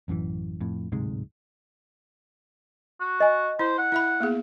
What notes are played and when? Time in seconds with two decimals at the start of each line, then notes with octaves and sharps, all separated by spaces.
0.08 A1 F#2 D#3 E3
0.61 F2 A2
0.92 D1 G#2 C3 G#3
3.00 F#4
3.20 D#5 G#5
3.59 E4 C5
3.78 F#5
3.92 E4 E5 B5
4.20 A#3 B3 G#4